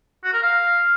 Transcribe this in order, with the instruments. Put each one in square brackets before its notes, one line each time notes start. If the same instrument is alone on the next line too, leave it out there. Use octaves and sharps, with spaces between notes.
[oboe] F#4
A#4
F5